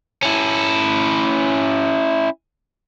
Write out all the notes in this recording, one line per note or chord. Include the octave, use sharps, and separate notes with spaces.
C#4 E4